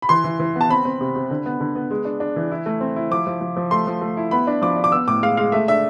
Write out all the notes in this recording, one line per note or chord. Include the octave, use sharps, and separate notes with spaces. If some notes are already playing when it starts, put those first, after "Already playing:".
B5
E3 C6
E3
E3
B3
A5
C4 B5
C4
C3
C3
D3
B3
D3
B3
G#3
D4
D4
E3
E4
A3
C4
E4
F3 D6
F3
F3
F3
A3 C6
F3
A3
E4
B3 B5
D4
F3 D6
D4
D6
B3 E6
A2 D6
G#3 F5
G#3 F5
A3 E5
D4 E5